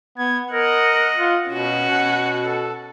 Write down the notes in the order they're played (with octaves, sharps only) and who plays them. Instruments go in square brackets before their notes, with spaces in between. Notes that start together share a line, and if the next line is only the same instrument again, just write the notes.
[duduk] B3 [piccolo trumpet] G#6
[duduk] A#4 [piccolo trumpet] D#5 [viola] F#5
[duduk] F4
[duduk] B2 [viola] C#4 F#4
[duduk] B2 [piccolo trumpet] F#5
[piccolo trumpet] A4